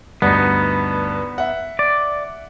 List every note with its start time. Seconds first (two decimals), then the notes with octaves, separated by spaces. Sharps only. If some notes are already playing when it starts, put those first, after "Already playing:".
0.22 D2 G2 B3 D#4
1.38 E5 F#5
1.79 D5